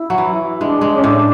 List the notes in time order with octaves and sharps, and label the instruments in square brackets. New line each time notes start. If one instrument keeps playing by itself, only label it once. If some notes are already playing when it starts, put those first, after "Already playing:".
Already playing: [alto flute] E4
[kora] F#3
E3
[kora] G#3 [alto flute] D4
[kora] G#3
[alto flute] C#4
[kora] A2 [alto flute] D4